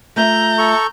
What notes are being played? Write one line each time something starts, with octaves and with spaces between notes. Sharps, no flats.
A3 F4 E5 A#5 G6
A4 C#6